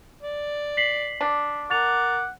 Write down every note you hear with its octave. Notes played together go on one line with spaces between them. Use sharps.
D5
B6 C7 F#7
D4
A#4 F#5 D6 A6 F7